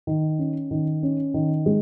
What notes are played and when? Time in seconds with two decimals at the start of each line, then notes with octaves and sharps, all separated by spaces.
0.07 D#3
0.39 C#4
0.71 D#3
1.03 C#4
1.34 D#3
1.66 G#3